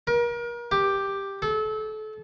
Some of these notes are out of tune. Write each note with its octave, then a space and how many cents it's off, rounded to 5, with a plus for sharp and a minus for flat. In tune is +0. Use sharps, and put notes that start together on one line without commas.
A#4 +35
G4 +5
A4 -30